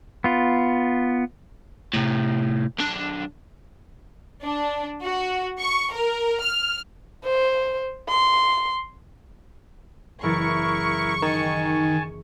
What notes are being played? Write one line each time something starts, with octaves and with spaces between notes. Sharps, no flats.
B3 F4
A2 C3
B1 D4
D4
F#4
C#6
A#4
F6
C5
C6
F#1 E3 E4 A#4 C#6 A6
D#3 G#5 A5